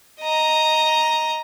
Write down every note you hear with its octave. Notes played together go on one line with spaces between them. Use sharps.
D#5 A#5